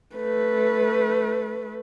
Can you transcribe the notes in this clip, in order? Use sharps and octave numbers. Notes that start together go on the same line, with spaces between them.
A3 B4